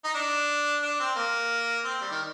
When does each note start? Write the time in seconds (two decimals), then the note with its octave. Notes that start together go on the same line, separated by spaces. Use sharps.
0.04 D#4
0.15 D4
0.82 D4
1.00 C4
1.16 A#3
1.84 C4
2.01 G3
2.11 D#3